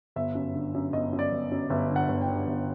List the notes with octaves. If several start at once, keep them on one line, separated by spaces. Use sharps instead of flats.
G1 E5
F#2
D3
F#2
G1 D#5
F#2
D5
G1
F#2
G1 E5
D3
F#5
G1
G5
D3
G1